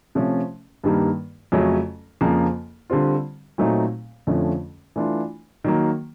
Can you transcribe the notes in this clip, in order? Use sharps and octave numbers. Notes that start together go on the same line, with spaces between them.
C3 F3 A3 C#4
G2 D#3 G3 A#3
F2 C#3 F#3 A3 C#4
F2 C#3 F3 A#3
D3 G3 C4 F4
A#2 F#3 A3 C4 D#4
F2 D3 F3 A3 C#4
E3 A3 D4 F4
D#3 F#3 A#3